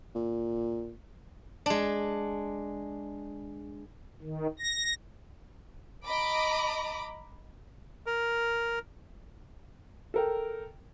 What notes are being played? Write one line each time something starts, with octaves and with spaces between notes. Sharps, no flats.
A#2
G#3 D4
D#3
A#6
D#5 A#5 B5 D6
A#4
A4 A#4 G5